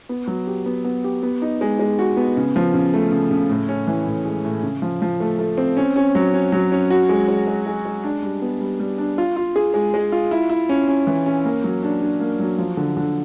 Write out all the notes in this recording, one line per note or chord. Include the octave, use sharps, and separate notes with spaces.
B3
F#3
G4
B3
B3
G4
B3
D#4
G#3
G#3
F#4
B3
C#3
F3
C#3
A3
C#3
C#3
A2
C#4
E3
A2
G#3
A2
C#3
F3
F3
A3
A3
C4
C#4
C#4
F#3
C#4
F#3
C#4
F#4
G#3
G#3
G#3
G#3
G#3
D4
G3
B3
G3
G3
D4
F4
F4
G#4
G#3
G#3
F4
E4
E4
C#4
C#4
E3
C#4
A#3
F#3
D4
D4
A#3
F#3
F3
D3
D3